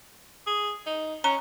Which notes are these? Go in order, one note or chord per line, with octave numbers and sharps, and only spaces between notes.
G#4
D#4
C#4 A#5